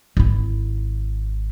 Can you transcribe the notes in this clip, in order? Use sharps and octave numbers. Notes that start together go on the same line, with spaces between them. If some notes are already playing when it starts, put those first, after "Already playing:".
G#1 E4